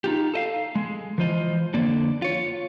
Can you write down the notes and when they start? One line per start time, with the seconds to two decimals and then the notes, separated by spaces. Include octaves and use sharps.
0.04 D#4 F4 G4
0.34 A4 D#5 F5
0.75 G#3
1.18 E3 F3 F4 C5 D#5
1.74 F2 D3 A#3 D5
2.22 F4 C#5